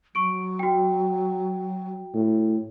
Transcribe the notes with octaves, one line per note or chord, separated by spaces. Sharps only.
F#3 C#6 D7
F#4 G5
A2